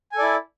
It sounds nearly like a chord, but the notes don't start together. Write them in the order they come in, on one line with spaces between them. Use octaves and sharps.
G#5 A4 D5 E4